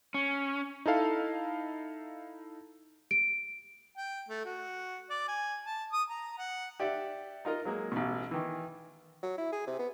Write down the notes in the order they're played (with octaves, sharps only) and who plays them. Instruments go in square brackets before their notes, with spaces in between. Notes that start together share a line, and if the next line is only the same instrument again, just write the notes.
[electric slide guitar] C#4
[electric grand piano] D#4 E4 A4 F5
[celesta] D7
[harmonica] G5
A3
F#4
D5
G#5
A5
D#6
A#5
F#5
[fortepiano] G4 D5 E5 F#5
D#4 F4 A#4 D#5
F#3 G#3 A#3
A1 B2
D#3 E3
[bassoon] F#3
E4
G#4
C3
B3